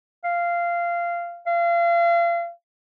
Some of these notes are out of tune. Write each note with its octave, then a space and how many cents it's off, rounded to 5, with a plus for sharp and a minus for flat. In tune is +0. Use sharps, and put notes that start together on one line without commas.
F5 -15
F5 -35